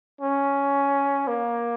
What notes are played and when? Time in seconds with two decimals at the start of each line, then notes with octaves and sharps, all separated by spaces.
0.21 C#4
1.27 A#3